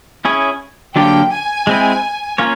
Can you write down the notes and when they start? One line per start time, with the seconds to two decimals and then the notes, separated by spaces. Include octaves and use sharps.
0.25 C#4 E4 G#4 C#5
0.96 D3 F#3 A#3 D4 G4 G5
1.32 G#5
1.67 G#3 C4 E4
2.38 A#3 C#4 F4 A#4 C#5